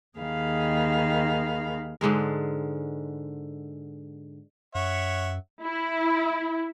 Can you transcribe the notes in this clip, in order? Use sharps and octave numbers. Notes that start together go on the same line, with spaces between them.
D#2 D#3 G#4 F5 B5
G#2 D3 G#3 A#4
F#2 C#5 E5 F#5
E4